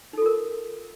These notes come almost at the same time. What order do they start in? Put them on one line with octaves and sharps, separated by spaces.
D#4 A4 F4 A#4